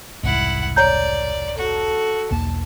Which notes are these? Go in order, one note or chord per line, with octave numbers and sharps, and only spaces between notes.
E1 C2 G#2 E4 F#5
C#5 D5 A#5 G6
F#4 A4
B1 E2 A#3 A5